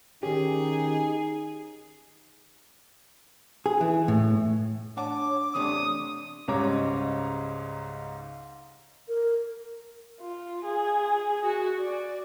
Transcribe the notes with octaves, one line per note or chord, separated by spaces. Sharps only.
D#3 C#4 D#4 G4 G#4
G#4
E3
A2
D4 C#5 F#5 A5 D6
E2 C3 A3 D4 D#6
C#2 G#2 G3 C#5 A#5 D6
A#4
F4
G#4
F#4
D5